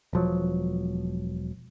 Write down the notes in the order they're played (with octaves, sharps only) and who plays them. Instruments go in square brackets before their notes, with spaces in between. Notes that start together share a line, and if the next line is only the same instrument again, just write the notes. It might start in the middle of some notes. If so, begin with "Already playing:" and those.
[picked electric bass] E1 F3 F#3